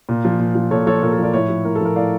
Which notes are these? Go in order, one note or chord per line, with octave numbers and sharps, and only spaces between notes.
A#2
F3
A#2
F3
A#2 A4 C#5
F3 A4 C#5
A#2 A#4
A4
F3 A#4 D5
A2 C#5 E5
F3
A2 A#4
A4
F3 A#4
A2 D5 F5